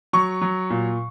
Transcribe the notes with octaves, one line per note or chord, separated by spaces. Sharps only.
F#3 C#6
F#3
A#2